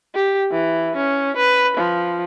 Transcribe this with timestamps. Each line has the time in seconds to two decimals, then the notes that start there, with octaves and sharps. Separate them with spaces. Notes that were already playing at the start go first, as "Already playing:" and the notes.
0.15 G4
0.52 E3
0.96 C#4
1.37 B4
1.77 F3